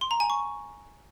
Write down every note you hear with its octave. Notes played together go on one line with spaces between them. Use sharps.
C6
A#5
G#5
C#6